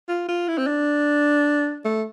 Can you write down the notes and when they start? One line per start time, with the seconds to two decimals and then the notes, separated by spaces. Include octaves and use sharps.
0.09 F4
0.28 F4
0.48 E4
0.58 C4
0.67 D4
1.85 A3